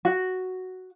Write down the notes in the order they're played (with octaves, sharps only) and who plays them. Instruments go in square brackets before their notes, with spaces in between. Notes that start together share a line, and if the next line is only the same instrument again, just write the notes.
[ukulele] F#4